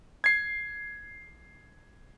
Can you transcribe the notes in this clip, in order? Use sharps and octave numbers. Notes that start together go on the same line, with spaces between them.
G#6 C7